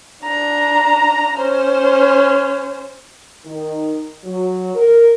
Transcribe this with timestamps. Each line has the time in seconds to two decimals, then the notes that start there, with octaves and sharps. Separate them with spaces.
0.24 D4 A#5
1.36 C#4 C5
3.46 D#3
4.25 F#3
4.75 A#4